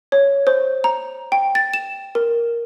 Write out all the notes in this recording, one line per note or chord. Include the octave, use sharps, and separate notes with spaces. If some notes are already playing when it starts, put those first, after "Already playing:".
C#5
C5
A#5
G5
A6
E7
A#4